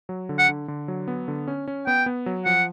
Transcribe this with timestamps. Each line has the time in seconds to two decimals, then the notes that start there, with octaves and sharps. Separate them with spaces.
0.09 F#3
0.29 D3
0.39 F#5
0.49 D3
0.68 D3
0.88 F#3
1.08 B3
1.28 D3
1.48 C#4
1.68 C#4
1.86 B3 G5
2.06 B3
2.26 F#3
2.45 F3 F#5